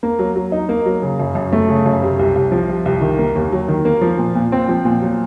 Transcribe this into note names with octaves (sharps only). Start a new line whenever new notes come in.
A#3
F#3
F#3
D#4
A#3
F#3
C#3
F#2
F#2
A3
C#3
F#2
C3
C2
C2
F3
C3
C2
D#3
A#3
D#2
F#3
D#3
A#3
F3
A#2
A#2
C4
F3
A#2
F#3